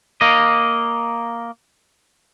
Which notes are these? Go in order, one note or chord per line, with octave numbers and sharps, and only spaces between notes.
A#3 D#5